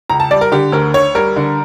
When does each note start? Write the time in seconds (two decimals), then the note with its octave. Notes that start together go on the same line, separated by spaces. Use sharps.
0.10 C#2 A#5
0.20 A5
0.31 G3 D5
0.41 A#4
0.52 D3 G4
0.72 D2 A#4
0.94 D2 C#5
1.15 G3 A#4
1.36 D3